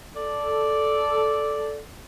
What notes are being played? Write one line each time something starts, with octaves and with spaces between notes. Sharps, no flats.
A4 D5